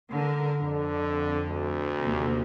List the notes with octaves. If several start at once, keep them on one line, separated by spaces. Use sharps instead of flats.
D3 A#4
F2 D3
D2
D#2 C3